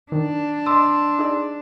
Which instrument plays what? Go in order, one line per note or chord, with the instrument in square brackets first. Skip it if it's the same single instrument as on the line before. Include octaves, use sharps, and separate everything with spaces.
[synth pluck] D#3 [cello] D4
[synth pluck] D#5 A5 D6 [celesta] C6 E6
[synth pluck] D#4 G#4 D5